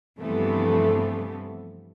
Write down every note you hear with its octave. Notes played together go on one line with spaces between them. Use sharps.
G2 C3 E3 F3 A3 B3